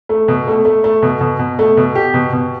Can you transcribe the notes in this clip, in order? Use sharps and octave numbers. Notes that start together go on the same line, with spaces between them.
A3
B2
A3
A3
A3
B2
B2
B2
A3
B2
G4
B2
B2